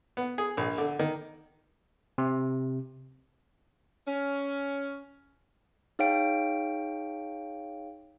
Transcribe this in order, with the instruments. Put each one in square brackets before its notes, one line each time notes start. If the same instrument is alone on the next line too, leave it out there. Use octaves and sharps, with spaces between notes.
[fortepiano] B3
G#4
A#1
D3
D#3
[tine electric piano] C3
[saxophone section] C#4
[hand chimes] D#4 G#4 C#5 F5 G5 D7